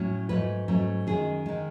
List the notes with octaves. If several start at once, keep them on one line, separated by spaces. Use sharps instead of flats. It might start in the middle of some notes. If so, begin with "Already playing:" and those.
Already playing: A2 F#3 C#4
G#2 F#3 A3 C#4 B4
G#2 F#3 A3 C#4
F#2 D#3 G#3 G#4
D#3 G#3